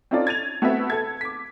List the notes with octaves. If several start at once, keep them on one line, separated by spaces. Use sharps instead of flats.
C4 C#4 D#4 F4 A4 D5
G#6 A6 D#7 F7
A3 B3 C4 F#4 B4 E5
A4 G#6
D6 B6